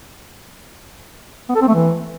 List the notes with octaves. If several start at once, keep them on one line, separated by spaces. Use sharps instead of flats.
B3
A4
C4
A3
E3